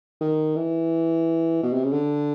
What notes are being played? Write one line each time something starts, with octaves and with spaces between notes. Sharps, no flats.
D#3
E3
B2
C3
C#3
D3